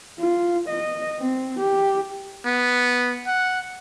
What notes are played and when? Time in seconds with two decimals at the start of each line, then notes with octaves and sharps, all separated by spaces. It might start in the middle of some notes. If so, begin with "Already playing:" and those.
0.19 F4
0.68 D#5
1.20 C4
1.59 G4
2.45 B3
3.27 F#5